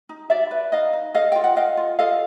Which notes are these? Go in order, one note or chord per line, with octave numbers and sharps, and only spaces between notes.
D#4
F#4 D5 E5
B4
D#4 D#5 F5
D#4
A4 D#5 F5
F4 G5
F#5
A4 D#5 F5
F4
A4 D#5 F5